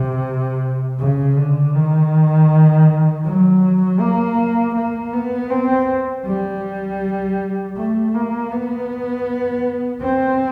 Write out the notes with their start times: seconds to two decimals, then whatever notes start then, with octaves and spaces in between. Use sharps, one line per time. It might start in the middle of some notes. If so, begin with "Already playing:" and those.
Already playing: C3
1.00 C#3
1.37 D3
1.75 D#3
3.26 F#3
4.01 A#3
4.76 A#3
5.13 B3
5.51 C4
6.26 G3
7.77 A3
8.14 A#3
8.51 B3
10.02 C4